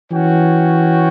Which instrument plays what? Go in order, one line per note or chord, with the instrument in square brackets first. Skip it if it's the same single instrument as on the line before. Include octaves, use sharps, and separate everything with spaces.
[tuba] E3 [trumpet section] C#4 F#4 C#5 G5